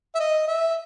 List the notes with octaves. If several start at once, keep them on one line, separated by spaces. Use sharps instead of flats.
E5
D#5
E5